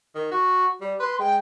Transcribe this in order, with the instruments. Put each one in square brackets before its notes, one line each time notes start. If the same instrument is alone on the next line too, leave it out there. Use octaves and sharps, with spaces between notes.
[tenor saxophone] D#3
F#4
G3
[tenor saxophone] B4 [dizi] C6
[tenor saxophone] G#3 [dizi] G5